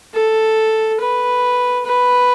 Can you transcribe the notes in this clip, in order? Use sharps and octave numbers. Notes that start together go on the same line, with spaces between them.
A4
B4
B4